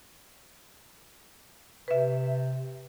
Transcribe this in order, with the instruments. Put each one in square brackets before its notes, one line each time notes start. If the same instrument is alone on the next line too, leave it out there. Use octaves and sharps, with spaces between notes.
[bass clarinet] C3 [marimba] B4 E5